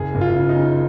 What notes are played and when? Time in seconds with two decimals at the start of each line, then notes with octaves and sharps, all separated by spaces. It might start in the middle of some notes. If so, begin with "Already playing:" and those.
Already playing: F#1 G#4
0.15 F#1
0.21 F4
0.35 C#3
0.49 D#4
0.56 C#3